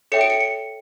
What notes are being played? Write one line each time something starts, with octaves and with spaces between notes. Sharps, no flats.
A4 C#5 E5 G5 C#7
D7
C#7
C#7